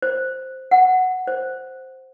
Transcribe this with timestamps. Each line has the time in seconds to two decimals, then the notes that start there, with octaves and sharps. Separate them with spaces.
0.02 C5
0.71 F#5
1.27 C5